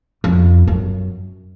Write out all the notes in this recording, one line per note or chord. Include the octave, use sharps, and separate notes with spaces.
F2
F#2